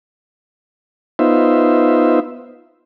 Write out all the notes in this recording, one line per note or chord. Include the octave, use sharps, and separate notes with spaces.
B3 D#4 F4 C5 E5